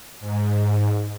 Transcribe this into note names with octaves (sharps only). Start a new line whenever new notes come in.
G#2